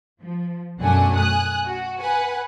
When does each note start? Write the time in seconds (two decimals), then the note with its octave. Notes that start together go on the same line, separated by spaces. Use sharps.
0.21 F3
0.80 B1 F#2 A3 D4 F#5 G#5
1.15 G#5 D#6 F#6
1.65 F#4
1.99 B4 F#5 G#5